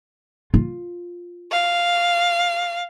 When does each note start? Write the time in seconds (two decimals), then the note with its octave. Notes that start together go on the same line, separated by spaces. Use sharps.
0.54 F4
1.51 F5